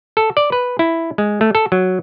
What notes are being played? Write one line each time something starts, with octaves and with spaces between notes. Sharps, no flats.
A4
D5
B4
E4
G#3
A3
A4
F#3